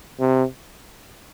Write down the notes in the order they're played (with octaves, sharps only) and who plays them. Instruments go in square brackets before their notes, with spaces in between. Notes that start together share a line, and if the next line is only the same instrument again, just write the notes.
[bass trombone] C3